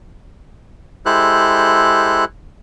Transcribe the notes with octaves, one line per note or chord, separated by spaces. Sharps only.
G#3 E4 G4 A4 C5 F#6